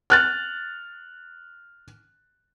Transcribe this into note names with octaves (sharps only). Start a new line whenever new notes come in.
F6 F#6 A6